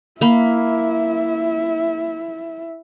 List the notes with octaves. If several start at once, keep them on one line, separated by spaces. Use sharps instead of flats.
A#3 E4 E5 B5